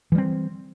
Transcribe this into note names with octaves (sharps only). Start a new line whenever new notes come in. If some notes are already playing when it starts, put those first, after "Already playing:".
E3 G3 C4